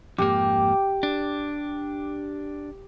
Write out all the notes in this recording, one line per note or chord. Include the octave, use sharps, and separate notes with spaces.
F2 G#2 A#3 G4
D4